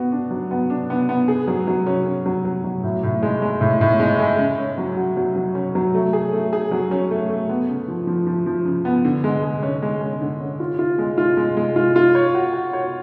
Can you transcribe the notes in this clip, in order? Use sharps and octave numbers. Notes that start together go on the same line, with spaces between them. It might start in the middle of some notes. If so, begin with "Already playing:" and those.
Already playing: B3 F#4
D4
F#3
B3
D4
B3
B3
G#4
F#3
F#3
C#4
C#4
F#3
F#3
F#3
A2
A2
G#3
G#3
A2
A2
G#3
G#3
C#3
C#4
F#3
F#4
F#3
F#3
C#4
F#3
A3
G#4
A3
G#4
F#3
C#4
A3
A3
B3
C#3
F3
F3
F3
F3
C#3
B3
D3
G#3
G#3
C#4
G#3
C#4
D3
C#4
F4
F4
G#3
F4
G#3
G#3
F4
F4
C#5
F#4
F#4
C#5